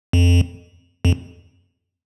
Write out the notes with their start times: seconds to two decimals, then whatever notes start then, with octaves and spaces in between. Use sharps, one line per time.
0.13 F2
1.05 F2